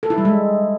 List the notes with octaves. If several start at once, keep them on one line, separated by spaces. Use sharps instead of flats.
A4
E4
G3
G#3